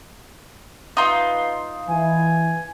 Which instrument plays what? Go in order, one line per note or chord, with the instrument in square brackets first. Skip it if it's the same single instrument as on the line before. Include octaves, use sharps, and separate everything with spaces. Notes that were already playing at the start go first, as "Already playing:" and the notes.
[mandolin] D#4 F4 [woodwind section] B4 C6
[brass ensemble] E3 [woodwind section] G#5